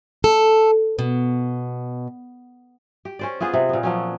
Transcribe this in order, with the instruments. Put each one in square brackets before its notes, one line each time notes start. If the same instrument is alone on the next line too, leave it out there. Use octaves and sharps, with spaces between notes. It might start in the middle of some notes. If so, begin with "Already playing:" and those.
[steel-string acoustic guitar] A4
B2
[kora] G4
C#4 C5 D5
B3 F4 G#4 C5
C3
A#2 B3
F3 F#3 C#4